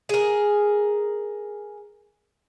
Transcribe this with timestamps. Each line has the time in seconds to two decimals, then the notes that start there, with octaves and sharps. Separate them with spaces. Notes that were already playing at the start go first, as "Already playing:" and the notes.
0.09 G#4 A#4